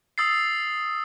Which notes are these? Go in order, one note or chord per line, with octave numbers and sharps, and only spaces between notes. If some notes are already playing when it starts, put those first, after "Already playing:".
D#6 E6 A6 C7